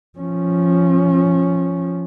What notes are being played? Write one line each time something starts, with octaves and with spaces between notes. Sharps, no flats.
F3 C#4